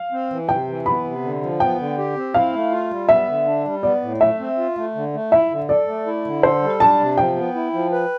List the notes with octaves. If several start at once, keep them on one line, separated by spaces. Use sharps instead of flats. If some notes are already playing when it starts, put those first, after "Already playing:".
Already playing: F5
C4
E3
C3 G5
E3
B3 B5
C3
D3
F3
B3 G5
D3
G4
C4
E4 F5
A3
F4
G3
B3 E5
D3
D4
G3
B3 D5
A2
A3 E5
C4
F4
A3
D3
A3
E4 E5
D3
A4 D5
A3
E4
D3
A4 C5
G3
D4 A5
C3
F3 G5
B3
E4
F3
B4